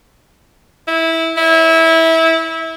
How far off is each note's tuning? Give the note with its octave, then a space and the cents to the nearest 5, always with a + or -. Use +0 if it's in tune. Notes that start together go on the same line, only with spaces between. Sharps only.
E4 -15
E4 -20